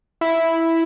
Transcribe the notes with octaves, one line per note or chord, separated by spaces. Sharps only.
E4